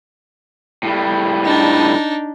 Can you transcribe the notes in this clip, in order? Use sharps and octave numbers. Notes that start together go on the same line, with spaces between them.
A2 G3
D4 D#4